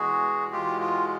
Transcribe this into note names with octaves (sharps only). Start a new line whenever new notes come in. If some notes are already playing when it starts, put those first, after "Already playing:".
Already playing: E2 B2 G#3 F#4 G#4
E2 B2 G#3 F4 G4
F4